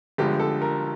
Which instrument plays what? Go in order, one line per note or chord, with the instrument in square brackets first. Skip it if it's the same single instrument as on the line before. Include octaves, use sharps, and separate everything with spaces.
[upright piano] G1 G2 D3 F3 G#3 G4
A4
A#4